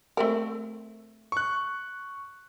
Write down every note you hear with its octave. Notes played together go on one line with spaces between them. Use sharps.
A3 C4 A#4
C#6 F#6